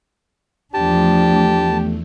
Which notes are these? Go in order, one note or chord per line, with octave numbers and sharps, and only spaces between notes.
E2 F3 A3 D4 G4 A5